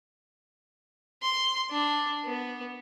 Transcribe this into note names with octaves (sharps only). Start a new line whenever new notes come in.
C6
D4
B3